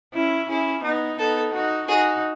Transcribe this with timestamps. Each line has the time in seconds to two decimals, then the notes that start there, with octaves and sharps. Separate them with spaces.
0.14 C#4 E4
0.49 C#4 E4 G#4
0.83 B3 D#4
1.18 B3 D#4 A4
1.54 D#4 F#4
1.88 D#4 F#4 G#4